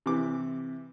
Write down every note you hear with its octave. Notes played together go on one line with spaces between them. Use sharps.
C3 E3 D6